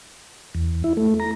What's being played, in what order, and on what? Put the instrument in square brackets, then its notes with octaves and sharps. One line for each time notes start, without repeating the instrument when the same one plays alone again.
[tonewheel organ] E2
E4
A3
A#5